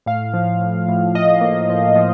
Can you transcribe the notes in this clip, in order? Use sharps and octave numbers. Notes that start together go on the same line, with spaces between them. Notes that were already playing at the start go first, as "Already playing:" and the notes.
A2 F5
F3
A2
A2
A2 D#5
A#3
F3
F3